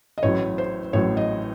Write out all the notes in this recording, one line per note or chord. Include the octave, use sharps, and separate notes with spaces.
D#5
A1 A2 F#3 C#5
C5
A1 A2 F#3 C#5
D#5